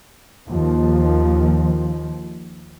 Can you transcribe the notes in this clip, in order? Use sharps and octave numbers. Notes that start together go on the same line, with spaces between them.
D#2 F3